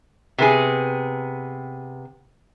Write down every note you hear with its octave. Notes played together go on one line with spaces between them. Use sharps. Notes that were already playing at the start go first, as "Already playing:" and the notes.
C3 B3 G#4